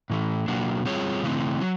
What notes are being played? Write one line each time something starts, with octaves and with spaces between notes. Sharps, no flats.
A2 E3 A3
B2 F#3 A#3 D4 F#4
G3 C4 F4 G#4 C#5
C#3 E3 A3 C4
F#3